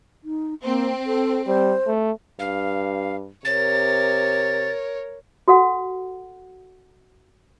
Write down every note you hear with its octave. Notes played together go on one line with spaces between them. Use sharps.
D#4
A#3 C4
A4
G3 C5
A3
G2 F5
C3 A#4 C#5 A6
F#4 A4 F#5